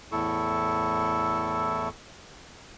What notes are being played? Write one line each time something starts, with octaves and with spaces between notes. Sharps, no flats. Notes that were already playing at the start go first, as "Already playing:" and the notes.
E2 A2 E4 A4 C#6